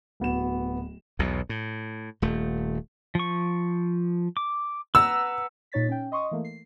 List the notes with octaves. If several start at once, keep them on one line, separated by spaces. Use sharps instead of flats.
D1 B3 F#4 E7
B1 E2 B2
A2
D#1 A3
F3 C#6
D6
B4 F#5 A#5 E6
A#2 D#4 C#5 A6 B6
C#4 G5
D#5 C6 C#6 D#6
E3 A3 A#3
C7